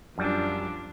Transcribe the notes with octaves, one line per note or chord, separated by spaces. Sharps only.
F#2 F3 G3 D4